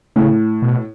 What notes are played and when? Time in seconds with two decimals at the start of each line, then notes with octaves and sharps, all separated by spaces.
0.16 A2 C#3
0.62 B2